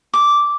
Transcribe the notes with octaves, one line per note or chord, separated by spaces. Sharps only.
D6